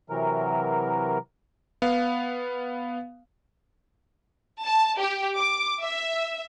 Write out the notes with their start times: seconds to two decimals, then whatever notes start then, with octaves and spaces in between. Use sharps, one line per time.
0.10 C3 E3 F#3 A#4
1.82 B3 F5
4.64 A5
5.00 G4
5.38 D6
5.82 E5